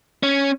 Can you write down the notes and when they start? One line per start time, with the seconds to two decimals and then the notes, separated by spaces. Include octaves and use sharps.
0.23 C#4